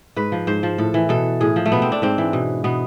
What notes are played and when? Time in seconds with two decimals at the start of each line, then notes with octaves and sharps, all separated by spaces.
0.16 G#2 B4
0.32 F3
0.47 G#2 C5
0.63 F3
0.78 A2 A4
0.94 E3
1.09 B2 A4
1.41 A2 G#4
1.56 F3
1.66 A3
1.72 B2 B3
1.82 C4
1.92 D4
2.02 G#2 C4
2.18 E3
2.33 B2
2.64 B2 B3